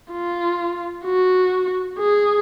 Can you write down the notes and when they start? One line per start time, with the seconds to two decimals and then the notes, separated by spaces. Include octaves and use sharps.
0.12 F4
1.05 F#4
1.99 G#4